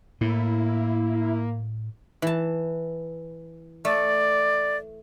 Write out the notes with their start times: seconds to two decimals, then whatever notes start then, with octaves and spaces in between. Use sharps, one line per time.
0.21 A2 A#3 E4
2.22 E3 A5
3.85 A3 D5